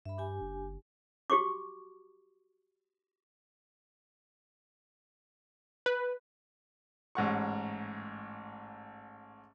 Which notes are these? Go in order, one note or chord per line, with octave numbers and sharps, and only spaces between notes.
G2 E5 B5
D4 G4 G#5
F#1
F#4 G4 C#6 D6
B4
A1 G#2 F#5 C#6